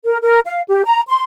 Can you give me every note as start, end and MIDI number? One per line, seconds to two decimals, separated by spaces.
0.05 0.17 70
0.22 0.39 70
0.45 0.61 77
0.68 0.82 67
0.84 1.01 82
1.08 1.23 84